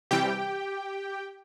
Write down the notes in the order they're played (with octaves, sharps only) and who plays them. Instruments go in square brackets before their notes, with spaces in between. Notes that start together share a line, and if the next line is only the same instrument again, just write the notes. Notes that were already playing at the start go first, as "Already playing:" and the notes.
[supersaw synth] C3 E3 G3 G4 G5